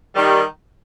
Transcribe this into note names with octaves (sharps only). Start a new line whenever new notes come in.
D#3 G3